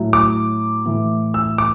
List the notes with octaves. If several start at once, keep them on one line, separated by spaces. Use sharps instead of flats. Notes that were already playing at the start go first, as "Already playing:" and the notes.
Already playing: A2 F#3
D6
A2 E3
E6
D6